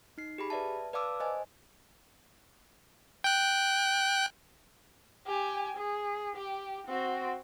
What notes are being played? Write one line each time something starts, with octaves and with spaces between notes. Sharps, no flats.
D#4 C7
G4 G#4 B5
B4 D5 E5 A5
B4 D5 F5 A5 D6 E6
C5 D#5 G#5
G5 F#6
G4 G#5
G#4
G4
C4 F#4